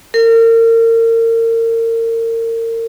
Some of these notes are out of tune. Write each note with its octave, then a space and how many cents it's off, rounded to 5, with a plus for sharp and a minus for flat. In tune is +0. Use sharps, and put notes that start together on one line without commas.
A#4 -35